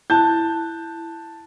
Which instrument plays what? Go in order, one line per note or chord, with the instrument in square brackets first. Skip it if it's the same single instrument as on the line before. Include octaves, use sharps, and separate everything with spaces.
[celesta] E4 F#6 [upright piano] A5 G6